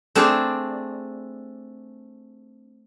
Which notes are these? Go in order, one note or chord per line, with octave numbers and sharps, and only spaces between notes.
A3 C4 D4 G#4 D5